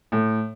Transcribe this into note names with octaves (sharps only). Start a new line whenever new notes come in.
A2